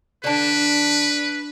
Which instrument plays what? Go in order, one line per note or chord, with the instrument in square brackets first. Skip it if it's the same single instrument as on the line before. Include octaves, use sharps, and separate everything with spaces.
[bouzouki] D3 A5 [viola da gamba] D4 [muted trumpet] B4